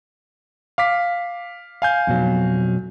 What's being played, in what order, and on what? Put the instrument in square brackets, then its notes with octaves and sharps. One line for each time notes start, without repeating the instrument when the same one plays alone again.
[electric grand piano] F5 D6 B6
F5 G#5 G6
[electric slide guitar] F2 B2 F#3